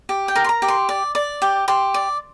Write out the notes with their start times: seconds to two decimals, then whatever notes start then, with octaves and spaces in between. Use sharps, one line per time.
0.09 G4
0.28 G5
0.36 A#4
0.44 C6
0.49 A#5
0.62 G4
0.68 C6
0.89 D5
1.15 D5
1.42 G4
1.68 G4 C6
1.94 D5